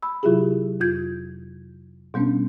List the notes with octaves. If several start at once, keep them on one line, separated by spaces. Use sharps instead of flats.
B5 E6
C3 F#3 E4 F4 G4 G#4
F2 F4 G6 G#6
B2 G3 B3 C#4 D4